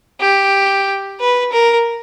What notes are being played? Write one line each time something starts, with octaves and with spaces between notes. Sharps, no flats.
G4
B4
A#4